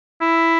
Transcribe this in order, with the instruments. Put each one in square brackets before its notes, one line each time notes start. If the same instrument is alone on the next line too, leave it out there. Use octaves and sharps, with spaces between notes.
[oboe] E4